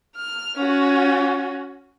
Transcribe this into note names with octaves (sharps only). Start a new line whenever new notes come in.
F6
C#4 F#4